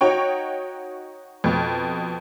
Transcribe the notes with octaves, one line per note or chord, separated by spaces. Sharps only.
D#4 F#4 C#5 G5 C#6
F2 B2